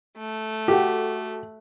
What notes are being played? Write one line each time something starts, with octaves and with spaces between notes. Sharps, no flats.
A3
F#4 G4 A4 G5